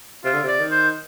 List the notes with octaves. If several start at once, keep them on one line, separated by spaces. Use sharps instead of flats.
C3 F4
D3
C3 D5
D#3
C5